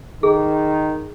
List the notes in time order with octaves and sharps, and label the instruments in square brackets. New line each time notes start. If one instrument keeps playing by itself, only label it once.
[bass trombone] D#3 [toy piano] G#4